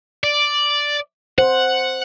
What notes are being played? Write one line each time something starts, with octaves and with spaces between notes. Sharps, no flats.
D5
C5 F#5